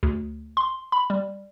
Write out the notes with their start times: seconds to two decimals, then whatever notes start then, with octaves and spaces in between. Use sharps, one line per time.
0.03 D2
0.57 C6
0.92 B5
1.10 G3